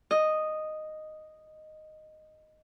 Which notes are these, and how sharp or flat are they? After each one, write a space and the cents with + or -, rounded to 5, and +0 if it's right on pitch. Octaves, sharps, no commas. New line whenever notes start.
D#5 -5